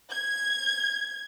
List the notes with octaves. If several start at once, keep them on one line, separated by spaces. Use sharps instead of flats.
G#6